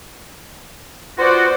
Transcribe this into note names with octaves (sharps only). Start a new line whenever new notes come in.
B3 F4 F#4 C5 D5